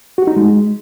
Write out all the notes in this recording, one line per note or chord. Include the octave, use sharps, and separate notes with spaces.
F#4
D#4
G#3